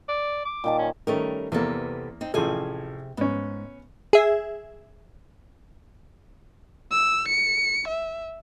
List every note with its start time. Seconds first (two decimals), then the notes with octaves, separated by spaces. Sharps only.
0.09 D5
0.45 D6
0.64 A#2 D#3 A5
0.79 C#4
1.07 D#3 G3 A3 C#4 A#4
1.52 E2 C3 A#3 B3 A4
2.21 C4 D#4
2.34 A1 C3 F3 G#4 A4 G#5
3.17 G#2 B3 C#4
4.13 G#4 E5
6.91 E6
7.28 C#7
7.88 E5